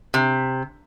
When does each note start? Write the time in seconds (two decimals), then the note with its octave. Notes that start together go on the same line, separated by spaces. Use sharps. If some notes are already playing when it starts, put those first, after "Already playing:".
0.14 C3